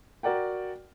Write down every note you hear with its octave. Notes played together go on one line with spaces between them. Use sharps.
F#4 A#4 D5 F#5 G5